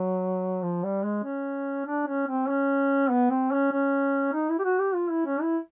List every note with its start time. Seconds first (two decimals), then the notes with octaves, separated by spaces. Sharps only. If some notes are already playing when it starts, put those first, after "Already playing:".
Already playing: F#3
0.62 F3
0.84 G3
1.04 G#3
1.24 C#4
1.86 D4
2.07 C#4
2.27 C4
2.49 C#4
3.10 B3
3.30 C4
3.52 C#4
3.72 C#4
4.33 D#4
4.49 E4
4.59 G4
4.64 F#4
4.79 G4
4.94 F4
5.10 E4
5.26 C#4
5.41 E4